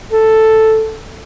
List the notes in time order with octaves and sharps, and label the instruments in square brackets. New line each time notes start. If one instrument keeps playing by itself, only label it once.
[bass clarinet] A4